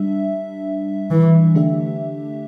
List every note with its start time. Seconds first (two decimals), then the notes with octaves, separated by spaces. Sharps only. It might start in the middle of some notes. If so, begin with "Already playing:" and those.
Already playing: G3 D4 E5
1.11 E3
1.55 D3 A3 D4 G4 E5